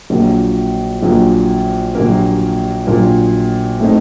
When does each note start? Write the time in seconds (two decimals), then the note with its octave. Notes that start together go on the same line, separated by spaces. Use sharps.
0.10 A#1 A#2 F#3 A#3
1.03 A#1 A#2 F#3 A#3
1.95 A#1 A#2 F#3 A#3
2.87 A#1 A#2 F#3 A#3
3.80 A2 A3 C4 D#4